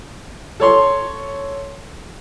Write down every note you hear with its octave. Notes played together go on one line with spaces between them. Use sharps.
A4 C#5 C6